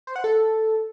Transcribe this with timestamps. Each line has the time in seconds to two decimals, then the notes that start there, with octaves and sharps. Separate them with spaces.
0.07 C5
0.16 F#5
0.24 A4